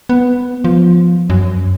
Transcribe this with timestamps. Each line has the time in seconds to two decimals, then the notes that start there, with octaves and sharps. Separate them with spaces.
0.09 B3
0.64 F3
1.30 F#2